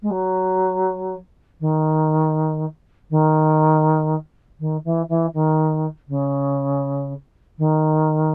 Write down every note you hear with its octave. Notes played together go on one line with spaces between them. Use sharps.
G#3
F#3
D#3
D#3
D#3
E3
E3
D#3
C#3
D#3